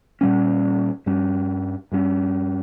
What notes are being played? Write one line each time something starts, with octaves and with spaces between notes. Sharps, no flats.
A#2 G3 C#4
G2 G3 C#4
G2 G3 C#4